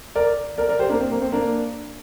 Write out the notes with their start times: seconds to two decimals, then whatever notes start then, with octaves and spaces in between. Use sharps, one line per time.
0.16 A#4 D5
0.58 A#4 D5
0.69 A#4 D5
0.79 G4 C5
0.89 A#3 D4
1.01 C4
1.11 A#3
1.22 C4
1.32 A#3 D4